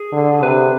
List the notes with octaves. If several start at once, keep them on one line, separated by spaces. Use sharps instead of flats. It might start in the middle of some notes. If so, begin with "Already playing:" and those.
Already playing: G#4
D3
C3 B4